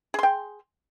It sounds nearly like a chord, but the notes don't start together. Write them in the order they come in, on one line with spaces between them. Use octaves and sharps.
G#4 C6 G5